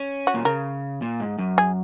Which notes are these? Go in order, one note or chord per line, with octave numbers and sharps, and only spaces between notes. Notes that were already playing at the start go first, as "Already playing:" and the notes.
Already playing: C#4
F#4
A#2
C#3 A#4
A#2
G#2
F#2
G#4